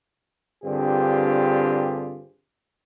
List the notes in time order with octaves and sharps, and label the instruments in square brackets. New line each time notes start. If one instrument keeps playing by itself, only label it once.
[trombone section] G2 D3 C4 F4 G4 G#4